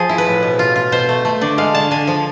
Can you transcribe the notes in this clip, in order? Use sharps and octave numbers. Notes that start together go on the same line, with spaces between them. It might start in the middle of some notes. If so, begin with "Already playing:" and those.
Already playing: F3 G#4
E4
B4
A2
B2
F4
F4
B2 C5
A3
A3
D3 D5
G#3 F5
D3 A5
D3 G#5
F3